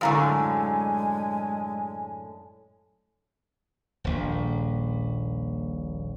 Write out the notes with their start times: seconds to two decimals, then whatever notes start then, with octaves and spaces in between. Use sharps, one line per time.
0.01 F#2 A2 D3 G#3 F5 G#5 A#5 C#6
4.04 D#1 A#1